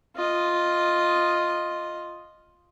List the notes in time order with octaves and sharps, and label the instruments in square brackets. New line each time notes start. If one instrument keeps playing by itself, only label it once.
[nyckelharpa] F4 D#5